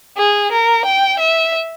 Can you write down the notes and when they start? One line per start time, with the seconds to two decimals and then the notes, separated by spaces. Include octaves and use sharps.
0.17 G#4
0.51 A#4
0.85 G5
1.19 E5